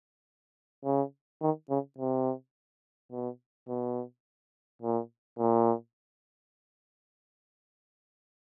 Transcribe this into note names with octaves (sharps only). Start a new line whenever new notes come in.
C#3
D#3
C#3
C3
B2
B2
A#2
A#2